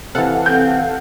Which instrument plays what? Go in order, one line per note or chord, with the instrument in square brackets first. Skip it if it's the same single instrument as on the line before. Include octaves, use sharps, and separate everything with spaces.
[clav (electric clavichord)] C3 E3 [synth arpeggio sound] A4 F5 F#5
[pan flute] C4 [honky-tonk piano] G6